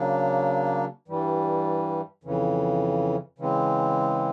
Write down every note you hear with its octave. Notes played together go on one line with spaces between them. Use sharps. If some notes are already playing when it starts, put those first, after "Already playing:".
Already playing: C#3 F#3 A#3 D4
G2 E3 G3
F2 C#3 E3
C#3 E3 G#3 C4